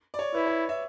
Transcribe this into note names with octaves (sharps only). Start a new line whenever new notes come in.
D5
C#5
E4 B4
C#5
E5